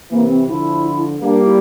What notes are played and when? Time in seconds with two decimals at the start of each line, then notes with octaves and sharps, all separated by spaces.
0.11 C3 E3 A#3
0.29 C4
0.47 D3 F3 E4
1.21 G3 A#3 D4
1.45 E4